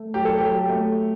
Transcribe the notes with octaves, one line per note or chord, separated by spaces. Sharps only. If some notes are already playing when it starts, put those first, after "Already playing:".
Already playing: A3
F#3 G4
A4
F#3 G4
A3